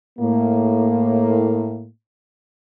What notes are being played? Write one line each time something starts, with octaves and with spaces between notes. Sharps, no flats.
A2 A#3